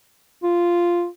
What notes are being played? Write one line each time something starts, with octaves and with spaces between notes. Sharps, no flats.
F4